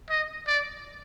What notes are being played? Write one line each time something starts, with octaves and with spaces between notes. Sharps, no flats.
D#5
D5